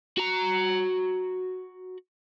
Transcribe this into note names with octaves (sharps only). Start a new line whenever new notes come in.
F#4 A#5